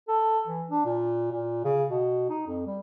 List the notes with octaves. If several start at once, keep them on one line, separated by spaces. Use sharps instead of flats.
A4
E3
D4
A#2
A#2
C#3
B2
D#4
F2
G3